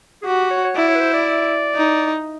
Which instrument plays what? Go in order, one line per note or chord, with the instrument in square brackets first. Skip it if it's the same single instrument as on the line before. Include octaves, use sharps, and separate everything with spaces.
[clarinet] G#4
[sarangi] F#4 [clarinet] G4
[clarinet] C#5
C#5
[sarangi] E4 [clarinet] D5
[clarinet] C#5
B4
C5
D5
[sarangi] D#4